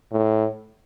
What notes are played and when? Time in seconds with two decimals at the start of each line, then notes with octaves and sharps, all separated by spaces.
0.12 A2